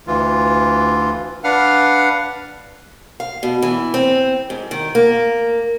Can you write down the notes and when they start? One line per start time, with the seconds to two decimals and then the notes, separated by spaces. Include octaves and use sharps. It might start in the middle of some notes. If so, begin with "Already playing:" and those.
0.07 D2 E3 F4
1.44 D4 B4 F5 F#5 F6
3.20 F5
3.43 B2
3.62 E3
3.94 C4
4.50 G#2
4.71 D#3
4.95 A#3